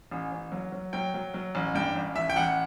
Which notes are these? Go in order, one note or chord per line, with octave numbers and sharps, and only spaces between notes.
A1
A1
F#3
F#3
F#3 G5
F#3
F#3
A1
G2 G5
A1
A1 E5
G5
A1 F#5